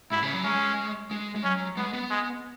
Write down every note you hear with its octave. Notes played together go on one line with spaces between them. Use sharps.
G#2 E4
C#3
F#3
G#3 C#4
G#3
G#3
F#3 C#4
G#3 B3
B3
G#3